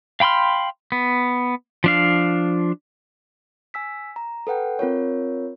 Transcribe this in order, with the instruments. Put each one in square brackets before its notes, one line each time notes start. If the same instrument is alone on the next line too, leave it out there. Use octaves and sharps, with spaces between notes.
[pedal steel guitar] F5 G5 B5 C6 F6
B3
F3 D4 F5
[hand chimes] G#5 E6 B6
A#5
A4 B4 F#5 G5
C4 F4 A#4 C#5